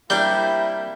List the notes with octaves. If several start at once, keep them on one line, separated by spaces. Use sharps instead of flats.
G3 A#3 C4 D4 E4 G6